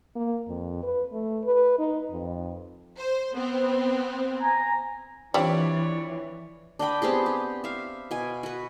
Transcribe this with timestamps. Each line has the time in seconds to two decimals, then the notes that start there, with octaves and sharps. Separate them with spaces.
0.16 A#3
0.48 F2
0.83 B4
1.12 A3
1.44 B4
1.79 D#4
2.11 F2
2.98 C5
3.34 B3 C4
4.40 G#5 A#5
5.34 E3 G3 C4 D4 F4 C#5 D5
6.79 D4 D#5 G5 B5
7.02 B3 C4 G4 G#4
7.26 G4
7.64 E5 F5
8.11 B2 G#5
8.43 F#4 B4